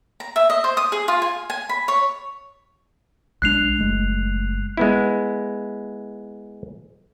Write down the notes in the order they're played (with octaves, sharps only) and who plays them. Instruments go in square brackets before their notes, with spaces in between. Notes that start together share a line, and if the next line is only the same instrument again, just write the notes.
[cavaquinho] A#5
E5
D#5
C5
D#6
G#4
F4
G#5
G#5
B5
C#5
[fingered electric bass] B1 G#3 D4 [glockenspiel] F#6 C7 F7
[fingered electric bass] F#1 G#3 A3
[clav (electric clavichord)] G#3 B3 E4